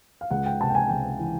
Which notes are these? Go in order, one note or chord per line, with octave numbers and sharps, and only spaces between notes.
F5
C#2 F#5
G5
C3 A5
G5
G#5
C#2 G5
E3